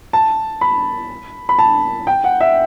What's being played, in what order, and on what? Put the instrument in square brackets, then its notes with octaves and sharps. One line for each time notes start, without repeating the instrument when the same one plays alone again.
[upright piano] A5
B5
B5
A5
G5
F#5
E5